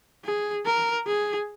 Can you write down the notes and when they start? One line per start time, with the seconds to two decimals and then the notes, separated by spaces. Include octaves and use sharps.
0.25 G#4
0.66 A#4
1.07 G#4